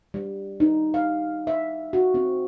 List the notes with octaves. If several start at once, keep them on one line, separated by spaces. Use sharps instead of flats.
G3
D#4
F5
E5
F#4
C4